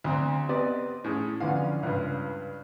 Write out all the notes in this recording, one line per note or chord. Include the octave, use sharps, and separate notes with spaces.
D2 C4 A#5
B3 C4 G4 B4 D5 D#5
A2 C#4 G#4
F2 D3 E3 C#4 F5
C#2 G2